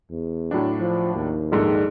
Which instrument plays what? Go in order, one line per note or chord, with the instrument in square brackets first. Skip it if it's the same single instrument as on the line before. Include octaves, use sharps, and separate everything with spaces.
[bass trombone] E2
[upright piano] A2 F#3 D4
[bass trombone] F3
D#2
[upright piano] A#1 G#2 A4